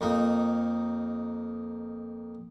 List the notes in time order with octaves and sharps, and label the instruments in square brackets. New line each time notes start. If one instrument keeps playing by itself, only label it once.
[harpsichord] F2 A#3 D#4